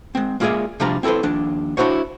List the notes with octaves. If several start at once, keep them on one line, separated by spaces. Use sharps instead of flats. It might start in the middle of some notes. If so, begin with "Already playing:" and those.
G#3 C4
G#3 A#3 F4 G#4 D5 E5
C3 F3 G3 D4 F4 A#5
C4 E4 A4 B4 C5
D#2 F3 D4
D4 E4 F#4 C5 C#5